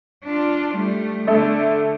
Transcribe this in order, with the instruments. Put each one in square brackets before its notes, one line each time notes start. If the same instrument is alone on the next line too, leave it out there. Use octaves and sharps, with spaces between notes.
[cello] D4 F4
G3 A3
[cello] D3 [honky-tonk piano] A3